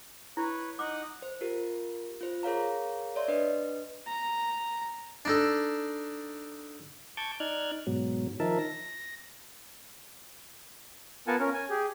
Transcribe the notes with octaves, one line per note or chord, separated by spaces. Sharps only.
E4 B4 C#5
D#4 F#5 D6
C5
F4 G4 A#4
F4 C5
G#4 A#4 C#5 F5 A#5
C#5 D5 E5 C6
D4 B4 D#5
A#5
D4 D#4 A4
A5 C#6 D6 G6 G#6
D#4 D5 F6 F#6 G#6
G#2 B2 F#3
D#3 F3 D#4 A#4 E5 A5
A#6
B3 F4 A#4 F#5 G#5 A5
C#4 A#4
G#5
G4 G#4